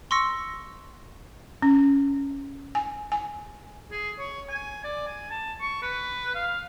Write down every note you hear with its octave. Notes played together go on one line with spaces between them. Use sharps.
C6 C#6 E6 A#6 C#7
C#4
G#5
G#5
G#4
C#5
G#5
D5
G#5
A5
C#6
B4
F5